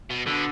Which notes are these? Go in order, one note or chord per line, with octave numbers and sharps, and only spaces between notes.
B2
B2 D3